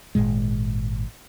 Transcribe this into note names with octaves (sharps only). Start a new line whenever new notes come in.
G#1 D#2 A#2 G#3